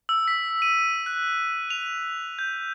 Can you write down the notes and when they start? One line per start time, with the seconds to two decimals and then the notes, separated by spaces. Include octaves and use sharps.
0.09 E6
0.28 B6
0.62 D#7
1.06 F#6
1.70 F7
2.39 G6